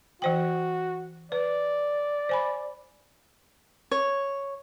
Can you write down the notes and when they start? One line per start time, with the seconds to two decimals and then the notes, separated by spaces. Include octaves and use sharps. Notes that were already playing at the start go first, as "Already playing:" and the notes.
0.22 E3 F#4 C5 G5
1.32 B4 D5
2.29 C5 G#5 B5
3.91 C#5